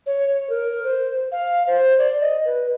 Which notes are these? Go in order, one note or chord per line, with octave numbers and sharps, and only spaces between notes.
C#5
A#4
C5
F5
C5
D5
D#5
B4